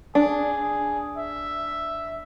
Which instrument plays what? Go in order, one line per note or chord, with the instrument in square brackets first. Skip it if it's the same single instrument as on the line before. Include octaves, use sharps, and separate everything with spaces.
[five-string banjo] D4 [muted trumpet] G#4
[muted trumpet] E5